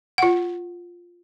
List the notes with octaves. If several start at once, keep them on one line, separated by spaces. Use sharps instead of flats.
F4 F#5